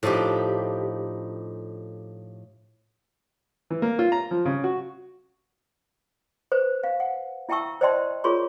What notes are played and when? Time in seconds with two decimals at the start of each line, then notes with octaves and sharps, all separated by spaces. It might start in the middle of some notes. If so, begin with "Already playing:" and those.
0.03 A2 F3 D4 D#4 G4
3.70 E3
3.82 A#3
3.99 F4
4.12 A#5
4.31 F3
4.45 C#3
4.64 F#4
6.52 B4 C5
6.84 F5
7.00 F#5
7.49 E4 E5 G5 A5 C#6 E6
7.81 C5 D5 D#5 G5 A5 C6
8.24 F4 G#4 A#4 C#5 C6 C#6